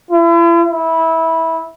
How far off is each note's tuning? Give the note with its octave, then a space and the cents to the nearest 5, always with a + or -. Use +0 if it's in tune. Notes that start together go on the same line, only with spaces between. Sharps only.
E4 +40
E4 -15